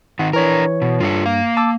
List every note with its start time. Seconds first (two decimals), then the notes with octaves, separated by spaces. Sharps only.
0.19 D#3 C4 F#5
0.33 E3 D4 A#4 C#5
0.82 B2
1.00 G2 F4 A4 C#5
1.26 A#3 F5
1.57 A5 D6 E6